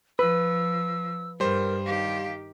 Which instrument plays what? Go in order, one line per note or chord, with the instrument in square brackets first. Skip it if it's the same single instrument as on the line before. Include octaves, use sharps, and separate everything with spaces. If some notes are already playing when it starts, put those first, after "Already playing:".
[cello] F3 [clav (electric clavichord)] B4 [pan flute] E6
[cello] G2 [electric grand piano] G3 C5 [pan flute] A#4
[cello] D#3 G4 [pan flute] F5